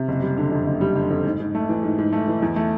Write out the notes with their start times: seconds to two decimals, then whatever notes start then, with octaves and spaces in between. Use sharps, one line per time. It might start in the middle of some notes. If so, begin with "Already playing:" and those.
Already playing: C3
0.08 F#1
0.22 G3
0.37 D3
0.51 F2
0.66 F#1
0.81 G3
0.96 D3
1.10 F2
1.25 G#2
1.40 G#2
1.55 A3
1.69 E3
1.83 G#2
1.98 G#2
2.13 A3
2.28 E3
2.42 E2
2.56 A3